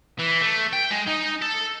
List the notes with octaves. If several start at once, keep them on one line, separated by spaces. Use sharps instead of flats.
E3
A3
G5
G#3
D#4
A4